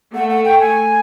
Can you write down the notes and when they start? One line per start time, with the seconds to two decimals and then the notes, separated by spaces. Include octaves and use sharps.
0.14 A3 F#5
0.30 F#5
0.45 G5
0.60 G#5